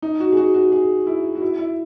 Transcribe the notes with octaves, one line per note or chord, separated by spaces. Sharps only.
D#4
F#4
G#4
F#4
F#4
G#4
E4
F#4
E4
E4